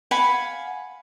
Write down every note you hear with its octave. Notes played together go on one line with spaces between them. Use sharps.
F5 F#5 G#5 B5